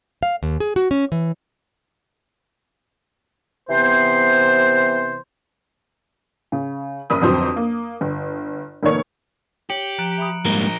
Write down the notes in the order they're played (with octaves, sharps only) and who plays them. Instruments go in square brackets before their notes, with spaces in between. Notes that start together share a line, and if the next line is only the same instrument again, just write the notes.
[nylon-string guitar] F5
D#2
G#4
F#4
C#4
E3
[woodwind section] C3 E3 B3 C5
[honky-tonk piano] C#3
F#1 B5 D#6
G1 F2 F#3 C4 C5 D#6
A#3
G1
F1 D#3 A#3 C#5
[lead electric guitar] G4 [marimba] C#5 [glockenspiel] C#7 F#7
[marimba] F3 [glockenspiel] A#5 F#6 D7
[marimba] E5 B5 D#6
[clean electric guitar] G#2 G3 A#3 [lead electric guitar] F3 A#4 [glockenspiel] G7